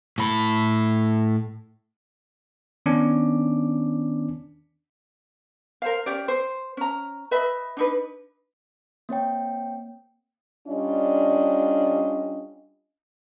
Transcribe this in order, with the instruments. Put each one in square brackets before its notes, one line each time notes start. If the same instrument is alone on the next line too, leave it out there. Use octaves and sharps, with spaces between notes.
[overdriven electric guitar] A2 B5
[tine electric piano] D#3 B3 C#4 D4 D6
[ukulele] A#4 C5 F5
C#4 G4 D5
C5
C#4 A#5
B4 D#5 E5 B5
D4 D#4 B4
[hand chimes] A#3 C4 C#5 G5
[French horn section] G3 C#4 D4 F4 D#5